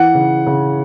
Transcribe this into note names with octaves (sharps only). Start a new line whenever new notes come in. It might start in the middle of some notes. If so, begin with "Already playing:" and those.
Already playing: E3 F#5
C#3
C#3